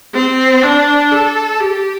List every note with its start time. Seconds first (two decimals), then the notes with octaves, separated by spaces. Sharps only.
0.14 C4
0.63 D4
1.11 A4
1.60 G4